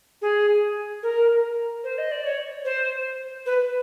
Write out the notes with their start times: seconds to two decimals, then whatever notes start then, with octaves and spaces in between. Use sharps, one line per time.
0.22 G#4
1.03 A#4
1.84 C5
1.98 D#5
2.12 D5
2.24 C#5
2.65 C5
3.46 B4